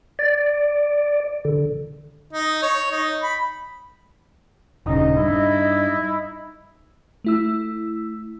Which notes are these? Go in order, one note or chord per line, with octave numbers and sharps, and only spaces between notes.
D5
D3
D#4
C#5
D#4
B5
D#1 C#3 D#4 D#5
G2 E4
A3 E4 E6